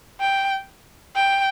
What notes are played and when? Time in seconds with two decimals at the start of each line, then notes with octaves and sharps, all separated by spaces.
0.20 G5
1.15 G5